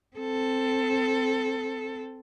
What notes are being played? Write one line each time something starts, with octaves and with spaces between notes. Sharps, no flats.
C4 A4